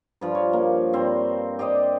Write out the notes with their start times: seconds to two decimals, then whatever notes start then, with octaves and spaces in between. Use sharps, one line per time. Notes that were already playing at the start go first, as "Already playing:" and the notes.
0.21 G2 F3
0.35 C#5
0.53 A#3
0.93 G2 C4 C5
1.59 G4 C5 D5 D#5